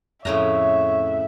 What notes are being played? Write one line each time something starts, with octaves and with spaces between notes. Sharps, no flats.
F2 A2 C#3 C#5 E5 A#5